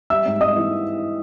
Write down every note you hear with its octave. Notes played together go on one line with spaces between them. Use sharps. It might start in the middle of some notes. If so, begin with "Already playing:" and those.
G3 E5 E6
G#2
G#2 D#5 D#6
E3